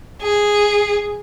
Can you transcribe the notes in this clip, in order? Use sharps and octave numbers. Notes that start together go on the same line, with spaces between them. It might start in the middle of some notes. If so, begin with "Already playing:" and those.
G#4